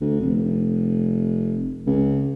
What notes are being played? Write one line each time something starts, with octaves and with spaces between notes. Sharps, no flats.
D2
F1
C#2